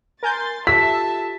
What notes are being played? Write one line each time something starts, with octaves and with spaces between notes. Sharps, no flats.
A#4 G#5 C6 G6 A6
F4 G4 A4 E5 A5 E6 B6